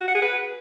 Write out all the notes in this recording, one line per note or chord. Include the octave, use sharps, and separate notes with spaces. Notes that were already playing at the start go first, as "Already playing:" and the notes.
F#4
F#5
G#4
B4